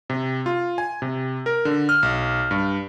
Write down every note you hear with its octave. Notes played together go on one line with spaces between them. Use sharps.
C3
F4
G#5
C3
A#4
D3
F6
B1
G2